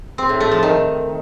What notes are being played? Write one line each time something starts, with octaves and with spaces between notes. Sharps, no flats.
C4
A2
A3
F3
D#3